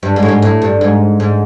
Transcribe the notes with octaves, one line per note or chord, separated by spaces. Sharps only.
G2
G#2
A2
G#2
A2
G2
G#2
G#2